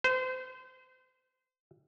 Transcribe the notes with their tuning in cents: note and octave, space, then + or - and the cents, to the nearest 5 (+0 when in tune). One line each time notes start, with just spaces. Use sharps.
C5 -30